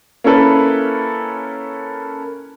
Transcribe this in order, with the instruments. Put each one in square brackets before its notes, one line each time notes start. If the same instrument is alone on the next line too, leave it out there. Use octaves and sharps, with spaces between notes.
[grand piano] A#3 C#4 E4 A4 B4